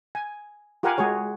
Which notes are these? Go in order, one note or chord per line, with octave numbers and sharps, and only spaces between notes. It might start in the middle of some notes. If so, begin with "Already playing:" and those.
G#5
F4 G4 A#4 F5 F#5 G#5
G#3 F#4 G#4 C#5